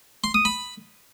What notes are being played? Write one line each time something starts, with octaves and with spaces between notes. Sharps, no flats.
C6
D#6
B5